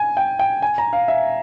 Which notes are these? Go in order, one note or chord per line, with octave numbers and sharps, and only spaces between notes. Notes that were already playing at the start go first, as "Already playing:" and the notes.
Already playing: G#5
G5
G5
G#5
A#5
F5
E5